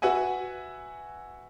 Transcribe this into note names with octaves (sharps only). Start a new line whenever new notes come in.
F#4 B4 E5 F#5 G#5